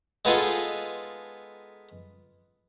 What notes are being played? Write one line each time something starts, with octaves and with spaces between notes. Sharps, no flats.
G#3 B3 D#4 F4 G#4 A4